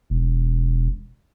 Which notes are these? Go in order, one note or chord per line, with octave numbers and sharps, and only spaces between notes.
E1